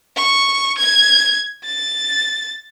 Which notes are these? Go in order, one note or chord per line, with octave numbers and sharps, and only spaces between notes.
C#6
G#6
A6